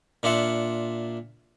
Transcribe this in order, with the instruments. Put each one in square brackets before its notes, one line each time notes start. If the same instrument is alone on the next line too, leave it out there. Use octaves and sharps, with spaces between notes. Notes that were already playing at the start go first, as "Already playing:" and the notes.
[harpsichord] A#2 D4 F4 E5 F#5